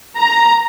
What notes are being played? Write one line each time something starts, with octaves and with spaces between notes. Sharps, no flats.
A#5